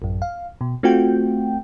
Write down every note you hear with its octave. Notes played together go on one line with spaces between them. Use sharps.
A1 F#2
F5
B2
A3 C4 F4 F#4 G5